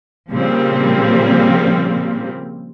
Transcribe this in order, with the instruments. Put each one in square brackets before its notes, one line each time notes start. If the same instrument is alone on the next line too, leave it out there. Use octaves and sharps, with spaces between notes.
[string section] A#2 C#3 F3 G3 A#3 C4